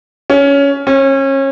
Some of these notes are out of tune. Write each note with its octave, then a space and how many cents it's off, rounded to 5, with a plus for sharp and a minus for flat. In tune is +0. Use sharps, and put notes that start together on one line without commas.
C#4 +15
C#4 -30